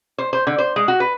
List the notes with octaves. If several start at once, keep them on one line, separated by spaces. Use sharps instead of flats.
C5
C5
D3
C5
G#3
F#4
B4